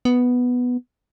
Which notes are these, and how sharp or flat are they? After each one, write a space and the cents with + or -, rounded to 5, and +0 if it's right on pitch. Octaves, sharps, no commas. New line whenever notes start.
B3 +0